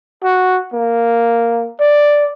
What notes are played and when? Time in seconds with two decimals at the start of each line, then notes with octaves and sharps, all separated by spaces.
0.24 F#4
0.73 A#3
1.80 D5